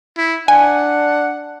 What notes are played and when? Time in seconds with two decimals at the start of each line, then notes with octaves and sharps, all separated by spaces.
0.18 E4
0.48 D4 F#5 G#5